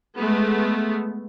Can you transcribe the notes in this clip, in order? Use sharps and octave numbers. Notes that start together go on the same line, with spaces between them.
G#3 A3 B3